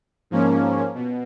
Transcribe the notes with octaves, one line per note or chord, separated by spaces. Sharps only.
G#2 F3 A#3 C#4
B2